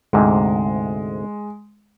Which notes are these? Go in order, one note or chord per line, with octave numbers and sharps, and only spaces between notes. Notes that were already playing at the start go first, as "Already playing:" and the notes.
D2 G#2 C3 G#3